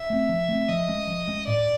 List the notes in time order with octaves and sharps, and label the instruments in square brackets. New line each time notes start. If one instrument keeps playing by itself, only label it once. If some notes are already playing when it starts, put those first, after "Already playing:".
Already playing: [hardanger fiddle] E5
[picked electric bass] A3 C4
F3
A3 C4
[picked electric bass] F3 [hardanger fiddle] D#5
[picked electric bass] G#3 C#4
F3
G#3 C#4
[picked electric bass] A2 [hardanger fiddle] D5